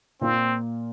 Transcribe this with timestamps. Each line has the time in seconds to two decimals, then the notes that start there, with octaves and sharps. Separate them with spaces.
0.21 A#2 A#3 C4 F4